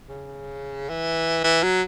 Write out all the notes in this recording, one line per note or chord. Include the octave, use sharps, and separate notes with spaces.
C#3
E3
E3
F#3